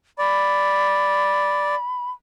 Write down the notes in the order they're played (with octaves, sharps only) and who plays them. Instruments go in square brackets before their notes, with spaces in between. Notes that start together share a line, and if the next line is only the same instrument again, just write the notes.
[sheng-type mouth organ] D5 [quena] B5